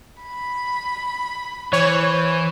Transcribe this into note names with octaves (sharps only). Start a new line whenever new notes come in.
B5
E3 C5 C#5